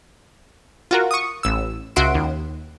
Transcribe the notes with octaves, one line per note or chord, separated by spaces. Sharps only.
F4 F#4 A#4
C#6 D#6
A1 E6
C#2 F#4 E5 C6 D7
D#2